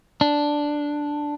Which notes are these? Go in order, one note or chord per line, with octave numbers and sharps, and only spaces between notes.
D4